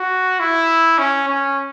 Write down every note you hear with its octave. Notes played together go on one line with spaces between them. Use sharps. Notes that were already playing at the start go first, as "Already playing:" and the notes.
Already playing: F#4
E4
C#4
C#4